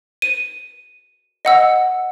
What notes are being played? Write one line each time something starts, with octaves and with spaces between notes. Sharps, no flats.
D#7
D#5 F#5 E6